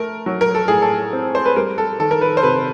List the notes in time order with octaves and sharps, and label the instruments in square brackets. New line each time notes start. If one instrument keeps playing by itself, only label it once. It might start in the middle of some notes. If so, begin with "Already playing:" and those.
Already playing: [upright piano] A3 A#4
F#3
A#4
A4
A2 G#4
A4
C4
C5
B4
G3 A#4
A4
D#3 A4
A#4
B4
C5
C3 B4